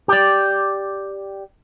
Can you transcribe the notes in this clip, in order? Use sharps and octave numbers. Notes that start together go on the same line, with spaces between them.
G4 D5